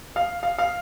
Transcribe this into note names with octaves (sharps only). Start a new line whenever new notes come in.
F5
F5
F5